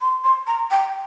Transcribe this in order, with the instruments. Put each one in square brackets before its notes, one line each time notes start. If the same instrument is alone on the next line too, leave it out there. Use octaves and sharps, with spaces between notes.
[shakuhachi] C6
C6
A#5
G5